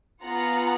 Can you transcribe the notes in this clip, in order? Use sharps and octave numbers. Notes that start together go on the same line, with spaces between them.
B3 F4 G#4 F#5 A#5